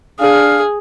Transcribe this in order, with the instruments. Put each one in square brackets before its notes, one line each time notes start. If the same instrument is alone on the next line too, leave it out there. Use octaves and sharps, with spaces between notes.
[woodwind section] D4 F5 [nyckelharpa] G#4